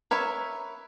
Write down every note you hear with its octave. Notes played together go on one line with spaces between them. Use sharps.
A#4 B4 C#5 E5